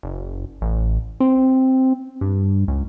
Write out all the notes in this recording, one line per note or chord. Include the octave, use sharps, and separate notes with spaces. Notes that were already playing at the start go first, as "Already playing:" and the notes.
F#1
A1
C4
G2
C#2